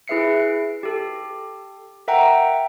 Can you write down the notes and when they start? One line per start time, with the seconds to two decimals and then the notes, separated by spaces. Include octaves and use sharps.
0.08 E4 G#4 B4 E5 C7 C#7
0.83 G4 A4
2.08 A#4 E5 F#5 G5 A#5